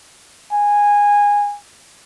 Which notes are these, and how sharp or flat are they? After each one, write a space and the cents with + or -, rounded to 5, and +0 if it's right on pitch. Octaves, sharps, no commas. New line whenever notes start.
G#5 -15